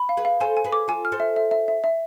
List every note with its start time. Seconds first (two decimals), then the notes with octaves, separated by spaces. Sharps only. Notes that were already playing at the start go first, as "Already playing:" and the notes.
Already playing: B5
0.09 F5
0.17 G#4 B4
0.25 F5
0.40 A4 C5 G#5
0.57 G#5
0.64 G#4 B4
0.73 D6
0.88 F4 A4 G#5
1.05 F6
1.12 A4 C5
1.20 E5
1.36 E5
1.51 E5
1.68 E5
1.84 E5